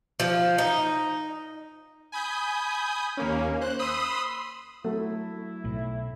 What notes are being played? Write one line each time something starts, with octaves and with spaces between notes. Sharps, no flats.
F3
D#4
G#5 B5 D#6 G6
D#2 A#3 C#4
C5 F#6
B5 C6 D#6 E6
F#3 A3 E4
B1 A2